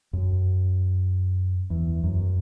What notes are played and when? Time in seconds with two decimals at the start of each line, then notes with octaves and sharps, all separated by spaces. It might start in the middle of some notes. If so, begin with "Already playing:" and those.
0.13 F#2
1.70 E2
2.04 F#2